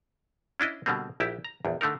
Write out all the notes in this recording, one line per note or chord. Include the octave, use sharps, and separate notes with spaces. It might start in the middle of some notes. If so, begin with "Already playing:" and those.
C#4 D4 E4 D#5
B2 D3 G3 A#3 C4
A#1 E4 G4 A5
A#5
A#1 E2
D3 A3 D#4 A#4